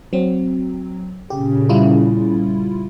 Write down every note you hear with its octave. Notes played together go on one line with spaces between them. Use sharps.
F#3 C4
A#2 C#3 G4
G3 E4 F4